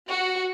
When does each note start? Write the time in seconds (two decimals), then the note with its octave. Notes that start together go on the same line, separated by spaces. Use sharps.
0.10 F#4